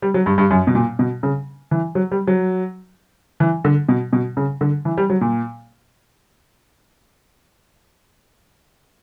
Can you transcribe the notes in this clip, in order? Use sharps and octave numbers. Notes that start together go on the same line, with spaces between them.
G3
F#3
G2
G2
F#2
B2
A#2
B2
C#3
E3
F#3
G3
F#3
E3
D3
B2
B2
C#3
D3
E3
G3
F#3
A#2